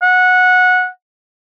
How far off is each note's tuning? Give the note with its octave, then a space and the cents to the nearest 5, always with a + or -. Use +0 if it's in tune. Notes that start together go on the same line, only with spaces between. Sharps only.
F#5 -15